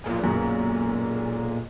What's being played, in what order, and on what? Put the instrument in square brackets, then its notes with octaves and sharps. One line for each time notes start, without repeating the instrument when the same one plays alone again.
[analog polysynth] B1 A#2 G#3
[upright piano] F#2